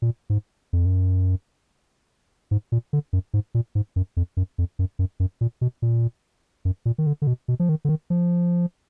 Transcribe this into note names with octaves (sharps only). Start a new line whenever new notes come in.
A#2
G#2
F2
F#2
G#2
A#2
D3
F#2
G#2
A#2
G#2
F#2
F2
F#2
F2
F#2
F#2
F#2
A#2
B2
A#2
F#2
A#2
D#3
D3
D3
B2
B2
F3
D#3
D3
D#3
F3